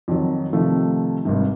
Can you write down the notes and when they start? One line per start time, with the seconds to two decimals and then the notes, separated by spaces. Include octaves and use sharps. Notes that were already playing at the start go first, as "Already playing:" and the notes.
0.08 F2 D#3 F#3
0.53 C3 D#3 F3 A3
1.25 G#1 G2 C3